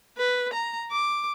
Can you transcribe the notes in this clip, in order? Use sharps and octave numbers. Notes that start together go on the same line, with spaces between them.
B4
A#5
D6